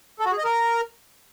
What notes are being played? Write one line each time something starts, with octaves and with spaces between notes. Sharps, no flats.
A4
F#4
G#4
D#5
A#4